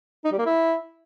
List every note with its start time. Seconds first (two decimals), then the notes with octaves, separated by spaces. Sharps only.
0.25 D#4
0.32 G3
0.39 A#3
0.46 E4